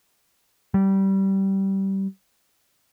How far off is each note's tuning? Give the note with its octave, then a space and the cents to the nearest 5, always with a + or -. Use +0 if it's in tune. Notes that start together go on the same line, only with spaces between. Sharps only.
G3 -20